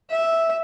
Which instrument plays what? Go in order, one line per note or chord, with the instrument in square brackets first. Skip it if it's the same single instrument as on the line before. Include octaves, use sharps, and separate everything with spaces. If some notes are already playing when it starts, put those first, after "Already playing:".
[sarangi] E5